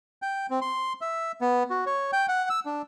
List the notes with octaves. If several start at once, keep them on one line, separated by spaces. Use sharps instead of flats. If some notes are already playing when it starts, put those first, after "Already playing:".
G5
C4
C6
E5
B3
F#4
C#5
G5
F#5
E6
D4